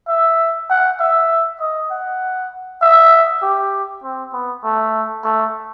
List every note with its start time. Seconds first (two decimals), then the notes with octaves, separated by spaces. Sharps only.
0.08 E5
0.70 F#5
1.00 E5
1.60 D#5
1.91 F#5
2.82 E5
3.42 G4
4.04 C4
4.33 B3
4.64 A3
5.24 A3